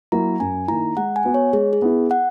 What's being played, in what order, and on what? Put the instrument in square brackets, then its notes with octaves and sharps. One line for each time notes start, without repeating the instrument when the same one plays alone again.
[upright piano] F#3 A#3 E4 A#4 [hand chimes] A#5
[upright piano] F#2 [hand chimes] G#5
[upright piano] D#3 A#3 E4 [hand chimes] A#5
[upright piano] G#3 [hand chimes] F#5
[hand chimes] G#5
[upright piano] B3 F#4 B4
[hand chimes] C#5
[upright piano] G#3 [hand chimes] G#4
[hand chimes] G#4
[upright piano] B3 E4
[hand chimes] F#5